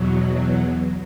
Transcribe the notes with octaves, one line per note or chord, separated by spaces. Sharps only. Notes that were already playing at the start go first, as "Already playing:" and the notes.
Already playing: E2 B2 F#3